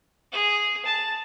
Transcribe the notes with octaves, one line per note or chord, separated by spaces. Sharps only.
G#4
A5